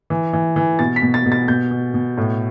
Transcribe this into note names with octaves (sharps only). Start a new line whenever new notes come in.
E3
E3
E3
B2 A6
B6
B2
A6
B2
A6
B2 G6
B2
B2
A2